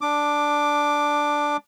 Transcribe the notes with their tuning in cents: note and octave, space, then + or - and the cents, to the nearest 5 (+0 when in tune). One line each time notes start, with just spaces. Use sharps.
D4 +0 D6 +10